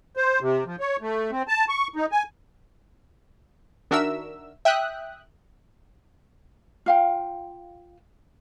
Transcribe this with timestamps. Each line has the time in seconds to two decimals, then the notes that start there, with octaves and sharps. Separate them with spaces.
0.17 C5
0.41 C3
0.66 F3
0.80 C#5
1.01 A3
1.31 C4
1.48 A5
1.69 C#6
1.96 D#4
2.12 G#5
3.91 D#3 D4 F#4 A#4 E5 E6
4.65 E5 G5 D#6 F#6
6.86 F4 F5 G5